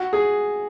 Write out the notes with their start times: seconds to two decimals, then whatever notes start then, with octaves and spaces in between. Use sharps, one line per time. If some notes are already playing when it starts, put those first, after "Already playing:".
Already playing: F#4
0.13 G#4